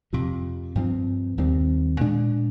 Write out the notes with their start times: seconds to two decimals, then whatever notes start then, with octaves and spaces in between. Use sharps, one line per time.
0.13 F2 C3 F3
0.75 G2 F3 C4
1.38 D#2 D#3 G3 C4
2.01 A#2 G#3 D4